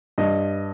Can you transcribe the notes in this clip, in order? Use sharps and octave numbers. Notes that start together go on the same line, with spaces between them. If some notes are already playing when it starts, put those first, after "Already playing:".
G2 D#5